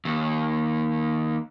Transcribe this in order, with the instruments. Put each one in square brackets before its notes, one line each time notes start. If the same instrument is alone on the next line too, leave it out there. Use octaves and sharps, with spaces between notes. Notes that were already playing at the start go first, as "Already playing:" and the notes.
[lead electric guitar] D#2